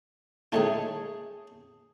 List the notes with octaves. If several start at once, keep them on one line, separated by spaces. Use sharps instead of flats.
D#3 A3 D#4 G#4 C#5 A5